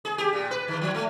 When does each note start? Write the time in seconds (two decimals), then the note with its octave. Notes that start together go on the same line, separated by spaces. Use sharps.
0.05 G#4
0.18 G4
0.33 A#2
0.51 B4
0.68 D#3
0.81 F3
0.95 A3